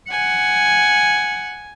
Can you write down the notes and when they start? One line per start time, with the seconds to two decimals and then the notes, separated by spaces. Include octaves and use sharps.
0.11 F#5 G#5